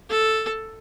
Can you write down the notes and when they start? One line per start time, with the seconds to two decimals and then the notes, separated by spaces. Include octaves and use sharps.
0.10 A4